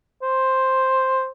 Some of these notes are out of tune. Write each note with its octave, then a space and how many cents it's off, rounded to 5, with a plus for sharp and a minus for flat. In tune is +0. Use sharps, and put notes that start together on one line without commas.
C5 +5